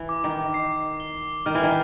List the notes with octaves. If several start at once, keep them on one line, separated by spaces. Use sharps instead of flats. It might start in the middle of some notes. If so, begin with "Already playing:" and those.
Already playing: E3
D6
D#3
C7
G7
D#3 F6
E3
D#3